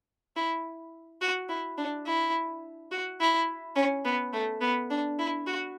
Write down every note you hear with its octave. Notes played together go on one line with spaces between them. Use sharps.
E4
F#4
E4
D4
E4
F#4
E4
C#4
B3
A3
B3
D4
E4
F#4